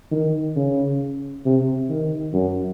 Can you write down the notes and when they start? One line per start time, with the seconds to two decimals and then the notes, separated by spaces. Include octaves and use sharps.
0.11 D#3
0.56 C#3
1.45 C3
1.89 D#3
2.33 F#2